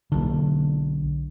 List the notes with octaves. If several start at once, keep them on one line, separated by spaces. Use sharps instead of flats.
B1 D3